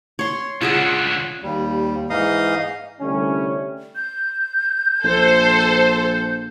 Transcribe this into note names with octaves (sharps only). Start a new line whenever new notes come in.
C#5 C6
C#2 D3 F4 G#4 F#5
D#2 G3
G#2 E3 D#4 D#5 F5 D#6
C2 D3 G3 A3 C#4
G6
A#1 A4 C5